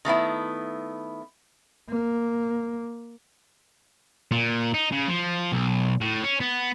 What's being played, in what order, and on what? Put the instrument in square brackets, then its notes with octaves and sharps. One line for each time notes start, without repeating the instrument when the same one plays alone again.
[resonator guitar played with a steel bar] D#3 A3 B3 E4
[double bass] A#3
[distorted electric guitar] A#2
D#4
C#3
F3
B1
A2
C#4
B3